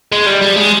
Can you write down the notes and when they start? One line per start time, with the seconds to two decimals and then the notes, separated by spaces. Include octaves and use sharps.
0.12 G#3
0.26 G3
0.41 G3
0.56 G#3